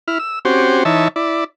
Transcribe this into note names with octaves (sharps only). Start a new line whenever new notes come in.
E4 F6
E6
C4 C#4 F#4 G4 C5
E3 D#4 C#5 E5 A5
E4 D5